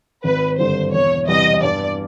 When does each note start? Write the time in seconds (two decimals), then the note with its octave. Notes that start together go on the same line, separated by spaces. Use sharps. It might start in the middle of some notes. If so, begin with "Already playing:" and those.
0.24 G#1 B4
0.58 G2 D3 G3 C5
0.93 E1 C#5
1.28 E2 C3 E3 G3 D#5
1.63 G2 D5